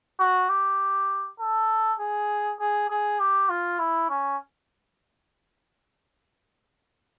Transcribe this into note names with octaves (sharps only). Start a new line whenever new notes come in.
F#4
G4
A4
G#4
G#4
G#4
G4
F4
E4
C#4